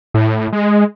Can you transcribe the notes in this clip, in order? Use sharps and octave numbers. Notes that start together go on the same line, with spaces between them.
A2
G#3